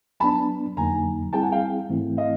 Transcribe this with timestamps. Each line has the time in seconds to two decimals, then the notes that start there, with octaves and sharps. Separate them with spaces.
0.20 F#3 B3 D4 A5 B5
0.77 F2 D3 F#3 A#3 D#4 G#5 A#5
1.33 G3 C4 E4 G#4 G5 A5
1.43 F#5 G#5
1.52 F5 G5
1.89 G#2 E3 A3 C4 E4
2.17 D#5 F5